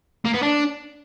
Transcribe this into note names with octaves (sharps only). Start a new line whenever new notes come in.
A#3
B3
D4